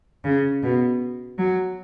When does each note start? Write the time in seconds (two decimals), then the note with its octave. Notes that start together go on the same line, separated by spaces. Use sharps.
0.24 C#3
0.63 B2
1.39 F#3